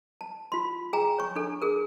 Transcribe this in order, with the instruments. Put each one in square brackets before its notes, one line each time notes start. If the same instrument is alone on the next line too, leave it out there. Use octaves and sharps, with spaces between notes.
[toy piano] A5
F4 C6
G#4 G5 G#5 A#5
C#5 C#6
D4 A4
G#4 A#4